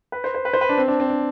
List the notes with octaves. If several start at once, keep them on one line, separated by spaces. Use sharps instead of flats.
B4
C5
C5
B4
C5
B4
D4
C4
D4
C4
D4